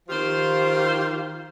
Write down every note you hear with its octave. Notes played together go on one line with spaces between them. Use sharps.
D#3 F3 F4 G4 C5